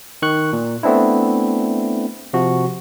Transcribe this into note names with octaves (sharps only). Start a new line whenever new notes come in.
D#3 C#6 F#6
A#2
A3 B3 C4 D4 E4
C3 F3 F#4